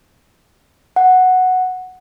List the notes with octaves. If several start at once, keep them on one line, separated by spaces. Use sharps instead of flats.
F#5